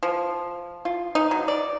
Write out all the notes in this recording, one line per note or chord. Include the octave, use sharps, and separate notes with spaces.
F3
F4
D#4
F#3
D5